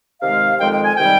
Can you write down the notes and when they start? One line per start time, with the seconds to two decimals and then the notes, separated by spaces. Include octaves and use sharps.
0.22 C3 D#3 G#3 F5
0.60 F2 D#3 G#3 G5
0.73 G5
0.85 G#5
0.97 C3 D#3 G3 G5